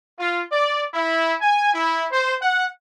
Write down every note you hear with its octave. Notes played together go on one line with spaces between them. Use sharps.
F4
D5
E4
G#5
E4
C5
F#5